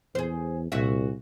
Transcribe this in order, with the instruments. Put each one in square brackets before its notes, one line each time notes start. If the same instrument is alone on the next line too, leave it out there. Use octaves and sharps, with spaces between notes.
[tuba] E2 [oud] G#4 C5
[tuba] C2 [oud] A#2 F#4 E5